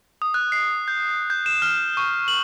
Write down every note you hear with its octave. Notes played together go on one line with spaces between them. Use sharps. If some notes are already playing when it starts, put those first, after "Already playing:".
D#6
F#6
C7
G6
G6
E7
F6
C#6
F#7